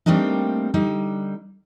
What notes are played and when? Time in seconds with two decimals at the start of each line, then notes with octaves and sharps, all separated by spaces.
0.06 G3 A3 A#3 C4 D4 D#4
0.74 D3 G3 D#4